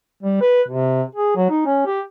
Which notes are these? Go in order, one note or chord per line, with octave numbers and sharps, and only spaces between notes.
G3
B4
C3
G#4
F#3
D#4
C#4
G4